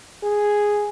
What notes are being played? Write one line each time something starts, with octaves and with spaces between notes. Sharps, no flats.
G#4